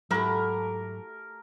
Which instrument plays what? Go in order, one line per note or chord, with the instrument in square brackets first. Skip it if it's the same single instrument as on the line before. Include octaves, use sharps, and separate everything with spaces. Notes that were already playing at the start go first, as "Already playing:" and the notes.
[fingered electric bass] G#2 F#3 [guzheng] A3 F#4 G4 [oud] E4 [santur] A#4